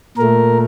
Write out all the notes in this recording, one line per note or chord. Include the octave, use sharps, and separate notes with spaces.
A#2 A3 A#4